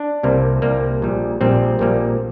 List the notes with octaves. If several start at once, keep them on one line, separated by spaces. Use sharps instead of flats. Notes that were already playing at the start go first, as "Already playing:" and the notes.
Already playing: D4
C2 C3 G3 A#3
C2 C3 G3 A#3
A#1 A#2 G3
A#1 A#2 G3 C4
A#1 A#2 G3 A#3